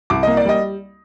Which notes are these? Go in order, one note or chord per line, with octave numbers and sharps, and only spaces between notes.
C2 D6
A#3 D#5
D5
G3 D#5